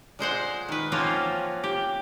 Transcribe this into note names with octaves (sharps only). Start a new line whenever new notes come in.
A#2 G#3 C5 F#5
D#3 B4
F3 A#3 C4 C#4 F4 F#4
G4